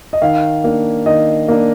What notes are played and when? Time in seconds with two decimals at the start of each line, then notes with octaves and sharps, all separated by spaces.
0.13 D#5
0.22 D#3 F5
0.64 A#3 D4
1.06 D#3 D#5
1.48 A#3 D4